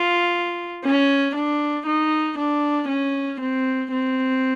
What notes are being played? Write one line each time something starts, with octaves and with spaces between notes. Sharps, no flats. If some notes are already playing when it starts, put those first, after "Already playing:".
Already playing: F4
C#4
D4
D#4
D4
C#4
C4
C4